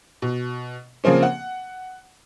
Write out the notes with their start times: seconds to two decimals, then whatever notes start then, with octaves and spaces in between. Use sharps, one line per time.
0.22 B2
1.04 C#3 F3 A#3 C4 C#4
1.23 F#5